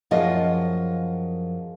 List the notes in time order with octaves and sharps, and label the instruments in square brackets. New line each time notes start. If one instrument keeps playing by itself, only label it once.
[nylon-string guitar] F#2 F3 G#4 D#5